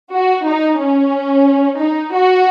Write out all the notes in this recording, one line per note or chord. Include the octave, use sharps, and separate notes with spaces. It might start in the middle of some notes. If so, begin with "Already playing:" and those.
F#4
D#4
C#4
D#4
F#4